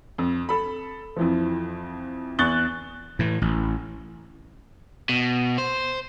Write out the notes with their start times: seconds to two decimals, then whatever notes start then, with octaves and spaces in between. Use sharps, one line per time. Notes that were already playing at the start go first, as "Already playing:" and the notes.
0.18 F2
0.49 A4 B5
1.17 F2 E3 F3
2.39 E2 C#6 F#6 A6 G7
3.19 A2 E3
3.42 A1
5.09 B2
5.58 C5